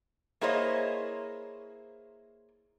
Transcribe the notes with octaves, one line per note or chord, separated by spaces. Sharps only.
A#3 E4 G#4 C5 C#5 D#5